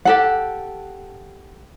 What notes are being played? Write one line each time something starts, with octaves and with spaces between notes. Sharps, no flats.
G4 A4 F#5